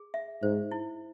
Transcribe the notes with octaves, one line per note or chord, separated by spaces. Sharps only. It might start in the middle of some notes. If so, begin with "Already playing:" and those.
Already playing: G#4
E5
G#2 C5
E4